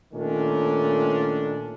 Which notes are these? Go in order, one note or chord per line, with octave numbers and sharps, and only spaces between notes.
A#2 D#3 A3 C#4 D4